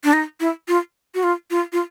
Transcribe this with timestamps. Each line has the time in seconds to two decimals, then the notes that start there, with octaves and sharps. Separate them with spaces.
0.04 D4
0.13 D#4
0.40 E4
0.68 F4
1.15 F#4
1.23 F4
1.51 F4
1.73 F4